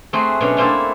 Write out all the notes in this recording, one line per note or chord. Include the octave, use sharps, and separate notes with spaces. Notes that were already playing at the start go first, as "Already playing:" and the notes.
A3 C4 F#4 G#4
B2 F#3 C#4 D4
A3 A#3 C4 D4 E4 A4